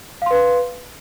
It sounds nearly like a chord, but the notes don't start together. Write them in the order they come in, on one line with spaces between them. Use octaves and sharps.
F5 C6 B4